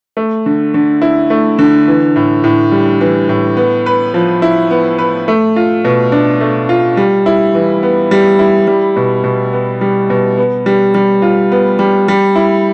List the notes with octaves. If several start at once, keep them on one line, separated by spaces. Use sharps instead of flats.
A3
D3
D3
E4
A3
D3
E3
A2
A2
G3
E3
A2
B3
B4
F3
E4
B3
B4
A3
F4
B2
D4
A3
F4
G3
E4
E3
B3
G3
E4
G3
B2
B2
B3
G3
B2
B3
G3
G3
F4
B3
G3
G3
E4